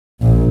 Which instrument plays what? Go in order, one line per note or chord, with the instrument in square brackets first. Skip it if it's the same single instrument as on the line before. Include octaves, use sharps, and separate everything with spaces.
[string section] A#1